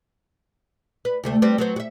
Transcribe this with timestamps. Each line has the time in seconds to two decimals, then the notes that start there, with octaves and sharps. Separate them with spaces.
1.05 B4
1.24 D2 C3 A3
1.42 G3 B3 C4
1.58 F#3 B3 C4
1.76 F#4 E5